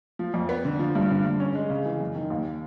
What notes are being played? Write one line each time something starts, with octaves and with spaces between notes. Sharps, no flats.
F3
F2
B3
D3
F3
G2
D3
G2
C#4
G#3
C#3
E3
F#2
D#3
D#2